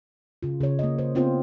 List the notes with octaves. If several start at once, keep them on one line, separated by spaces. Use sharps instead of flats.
C#3 F4
C#3 C#5
A#3 D#5
C5
B3 C4 F4 C5